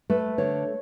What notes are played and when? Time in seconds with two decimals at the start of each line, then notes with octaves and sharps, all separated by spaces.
0.10 A3 B4
0.38 D3 C#5